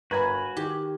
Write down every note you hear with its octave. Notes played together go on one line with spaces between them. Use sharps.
G1 F#4 A#4 B4 G#5 A#5 B5
D#3 G4